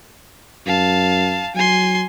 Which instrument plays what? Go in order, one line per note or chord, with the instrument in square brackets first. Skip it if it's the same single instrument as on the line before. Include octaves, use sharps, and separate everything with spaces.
[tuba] F#2 [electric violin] F5 A5
[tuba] F#3 [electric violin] G#5 C6